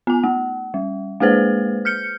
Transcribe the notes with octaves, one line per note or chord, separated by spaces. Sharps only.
B3 G#5
A3
G3
G#3 A#3 G#4 B4 C5
F6 G6 C#7